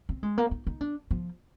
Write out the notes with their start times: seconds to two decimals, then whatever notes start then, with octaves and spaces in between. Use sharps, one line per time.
0.09 C4
0.23 G#3
0.38 A#3
0.51 D#4
0.67 D#4
0.81 D4
1.11 F3